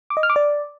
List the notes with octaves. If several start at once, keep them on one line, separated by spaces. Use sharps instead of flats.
D6
D#5
F6
D6
D5